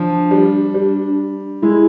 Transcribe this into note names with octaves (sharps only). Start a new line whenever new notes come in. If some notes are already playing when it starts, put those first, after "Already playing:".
Already playing: F3 D4
G3
G3
G#3 E4